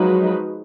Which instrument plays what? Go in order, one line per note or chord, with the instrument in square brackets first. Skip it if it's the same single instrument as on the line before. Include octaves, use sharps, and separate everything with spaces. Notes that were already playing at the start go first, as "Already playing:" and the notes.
Already playing: [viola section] F3 G#3 D#4 F#4 B4 [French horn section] F#3